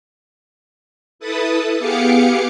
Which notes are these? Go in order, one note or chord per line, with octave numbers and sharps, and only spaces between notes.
E4 A4 B4 A5 D#6
B3 G4 G#4 F5 D6 C#7